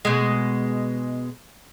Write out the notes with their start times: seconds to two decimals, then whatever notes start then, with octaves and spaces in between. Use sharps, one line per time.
0.05 B2 G#3